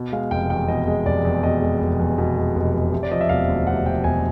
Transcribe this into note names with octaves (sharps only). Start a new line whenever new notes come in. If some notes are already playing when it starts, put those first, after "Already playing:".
Already playing: B2
G#3 F5
F1 G5
E2 G5
B2 D#5
G#3
F1 D5
E2
B2 D#5
G#3
F1
E2
B2
G#3
F1
E2
C3
D5
F3 D#5
E5
E1 F5
D2
C3 F#5
F3 G5
E1 G#5